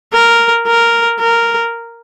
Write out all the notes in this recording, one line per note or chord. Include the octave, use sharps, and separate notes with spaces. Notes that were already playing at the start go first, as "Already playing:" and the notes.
A#4
A#4
A#4